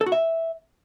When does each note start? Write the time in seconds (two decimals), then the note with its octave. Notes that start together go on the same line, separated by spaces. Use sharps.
0.01 A4
0.06 F#4
0.12 E5